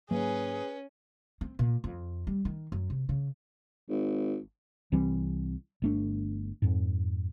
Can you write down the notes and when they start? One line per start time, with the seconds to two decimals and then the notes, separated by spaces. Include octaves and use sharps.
0.11 G#2 F#3 A#3 C#4 G#4 B4
1.41 C4
1.59 A#2
1.84 F2
2.27 G3
2.45 D#3
2.72 F#2
2.90 C3
3.09 C#3
3.90 G#1
4.92 C2 E3 G3 C4
5.82 G1 A3 D4
6.62 F2 G#2